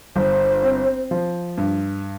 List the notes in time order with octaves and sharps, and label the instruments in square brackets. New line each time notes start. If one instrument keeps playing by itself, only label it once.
[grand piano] G1 [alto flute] C5
[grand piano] C4
F3
G2